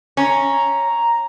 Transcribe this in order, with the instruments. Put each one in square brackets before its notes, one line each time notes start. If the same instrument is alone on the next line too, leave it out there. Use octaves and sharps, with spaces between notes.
[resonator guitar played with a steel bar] C#4 [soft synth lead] A#5